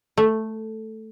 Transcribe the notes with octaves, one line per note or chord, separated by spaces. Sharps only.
A3